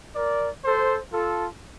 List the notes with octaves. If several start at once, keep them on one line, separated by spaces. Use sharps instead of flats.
A#4 D5
A4 C5
F4 A4